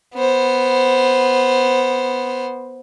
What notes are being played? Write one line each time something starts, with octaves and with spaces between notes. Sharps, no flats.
B3 C5